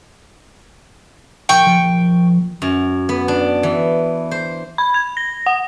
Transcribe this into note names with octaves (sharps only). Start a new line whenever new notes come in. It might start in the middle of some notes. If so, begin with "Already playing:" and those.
A#1 G5 C#6
F3
F#2
B3
D4
E3
C5
B5
G#6
A#6
F#5